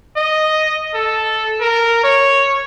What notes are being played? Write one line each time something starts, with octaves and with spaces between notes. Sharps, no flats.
D#5
A4
A#4
C#5